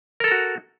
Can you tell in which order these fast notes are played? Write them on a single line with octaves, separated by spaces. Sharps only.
A#4 A4 A#5 F#4